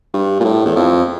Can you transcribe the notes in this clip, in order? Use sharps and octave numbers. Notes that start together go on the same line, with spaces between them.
G2
A#2
A2
E2
F2